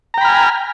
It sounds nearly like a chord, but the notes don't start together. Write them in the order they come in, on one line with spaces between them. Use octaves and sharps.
A#5 G5 B5 F6 G#5